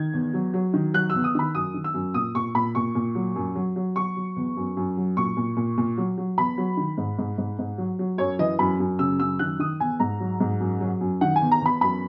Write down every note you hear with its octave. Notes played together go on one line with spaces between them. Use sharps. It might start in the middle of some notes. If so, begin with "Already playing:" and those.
Already playing: D#3 G#6
E2
F#3
F#3
D#3
F#3 F#6
E2 E6
D#6
D#3 B5
F#2 D#6
D#3
E6
F#2
A#2 D#6
A#2 C#6
A#2 B5
A#2 C#6
A#2
F#3
F#2
F#3
F#3
F#3 C#6
F#3
E2
F#2
F#2
F#3
A#2 C#6
A#2
A#2
A#2
F#3
F#3
E2 B5
F#3
D#3
G#2
G#2
G#2
G#2
F#3
F#3
F#2 C#5
E3 D#5
F#2 B5
F#2
C#3 E6
F#2 E6
D#3 F#6
D#3 D#6
E2 G#5
G#2 A#5
F#3
G#2
F#2
F#3
F#2
D#3 F#5
G#5
E2
A#5
E2 B5
F#2 B5